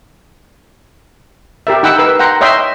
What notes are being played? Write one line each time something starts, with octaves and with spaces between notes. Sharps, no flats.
G4 A#4 E5
D#4 F#5 G5 B5 E6
A#4 B4 E6
F#5 G5 A#5 C6
C#5 D#5 E5 G5 C6